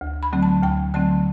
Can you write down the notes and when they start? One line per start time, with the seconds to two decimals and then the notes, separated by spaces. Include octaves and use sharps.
0.01 D2
0.23 B5
0.33 D3 F#3 A3 C4
0.43 A5
0.62 D2 G5
0.94 D3 F#3 A3 C4 A5